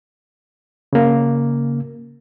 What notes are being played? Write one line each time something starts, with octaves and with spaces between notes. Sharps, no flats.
C#3 A#3